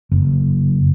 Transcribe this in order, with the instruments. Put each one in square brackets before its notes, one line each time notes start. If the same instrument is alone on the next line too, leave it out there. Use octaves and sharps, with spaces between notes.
[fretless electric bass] F#1